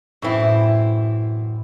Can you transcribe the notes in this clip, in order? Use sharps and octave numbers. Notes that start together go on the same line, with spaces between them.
F#2 A2 E3 C4 E4